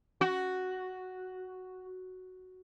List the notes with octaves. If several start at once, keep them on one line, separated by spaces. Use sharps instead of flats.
F#4